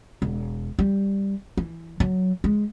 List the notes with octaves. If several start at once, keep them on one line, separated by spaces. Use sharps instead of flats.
E1
G3
E3
F#3
G#3